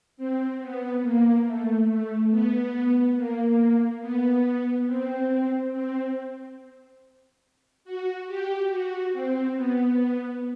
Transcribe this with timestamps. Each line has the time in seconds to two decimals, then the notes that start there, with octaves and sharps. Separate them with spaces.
0.17 C4
0.60 B3
1.02 A#3
1.45 A3
1.88 A3
2.30 B3
3.16 A#3
4.01 B3
4.87 C4
5.72 C4
7.85 F#4
8.27 G4
8.70 F#4
9.13 C4
9.55 B3